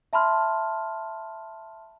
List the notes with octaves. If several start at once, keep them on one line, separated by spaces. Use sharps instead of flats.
E5 A5 B5 C6 F6